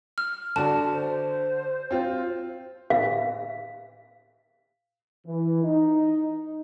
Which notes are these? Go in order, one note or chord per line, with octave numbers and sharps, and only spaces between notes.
F6
D3 F#4 D5 A5
C5
C4 F4
F5
E3
D#4